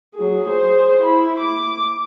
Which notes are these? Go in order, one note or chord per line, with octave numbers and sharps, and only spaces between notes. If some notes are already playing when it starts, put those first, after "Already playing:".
F#3 G#4
G#4 C5
E4 B5
D6